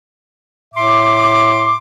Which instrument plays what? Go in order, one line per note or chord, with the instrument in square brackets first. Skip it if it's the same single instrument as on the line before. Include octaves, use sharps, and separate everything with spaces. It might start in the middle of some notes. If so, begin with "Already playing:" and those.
[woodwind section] A2 E5 C6 D6